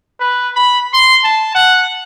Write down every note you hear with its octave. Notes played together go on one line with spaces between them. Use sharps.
B4
B5
C6
A5
F#5